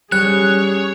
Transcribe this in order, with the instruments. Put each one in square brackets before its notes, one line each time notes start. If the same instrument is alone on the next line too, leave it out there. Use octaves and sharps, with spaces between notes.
[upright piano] G3 [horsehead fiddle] C#4 G#4 [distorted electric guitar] C#5 [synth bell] F#6